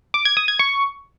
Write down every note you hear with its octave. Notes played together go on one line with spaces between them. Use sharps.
D6
G#6
D#6
G#6
C#6